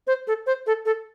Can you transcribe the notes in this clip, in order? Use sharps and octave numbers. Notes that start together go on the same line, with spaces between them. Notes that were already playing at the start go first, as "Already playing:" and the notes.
C5
A4
C5
A4
A4